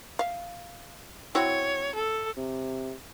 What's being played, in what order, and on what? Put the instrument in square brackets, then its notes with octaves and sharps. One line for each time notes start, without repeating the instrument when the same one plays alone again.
[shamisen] E5 F5
[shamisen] C4 E4 F#4 [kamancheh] C#5
[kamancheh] A4
[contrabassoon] C3